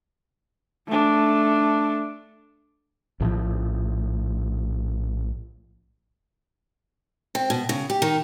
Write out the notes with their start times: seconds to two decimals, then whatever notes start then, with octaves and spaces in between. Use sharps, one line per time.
0.88 A3 D4
3.20 A#1 A2 C3 F3
7.35 C4
7.50 B2
7.69 C#3
7.90 G4
8.02 D#3